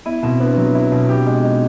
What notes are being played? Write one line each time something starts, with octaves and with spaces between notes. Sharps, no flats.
B3 E4
B2 C4
B3 D4
F#3
E4
B2
G4
G#3
D#4